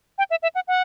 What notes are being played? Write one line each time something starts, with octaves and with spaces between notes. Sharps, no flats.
G5
E5
E5
F#5
F#5